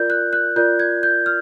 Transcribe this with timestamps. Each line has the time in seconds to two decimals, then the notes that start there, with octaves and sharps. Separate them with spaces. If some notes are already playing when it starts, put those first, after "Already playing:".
Already playing: F4 A#4 D5 G6
0.10 F#6
0.33 F#6
0.56 F4 A#4 D5 G6
0.79 G#6
1.03 G6
1.26 F6